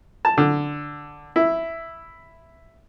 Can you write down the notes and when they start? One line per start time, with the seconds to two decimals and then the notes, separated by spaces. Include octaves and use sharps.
0.25 A5
0.38 D3
1.36 E4